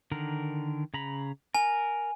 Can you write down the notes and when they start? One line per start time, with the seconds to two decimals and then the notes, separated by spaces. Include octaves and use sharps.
0.11 D3 D#3 A#4
0.94 C#3 A#5 B5
1.55 A#4 G#5